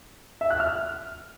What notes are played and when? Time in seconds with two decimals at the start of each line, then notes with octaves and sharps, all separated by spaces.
0.41 E5
0.50 F#6
0.60 F6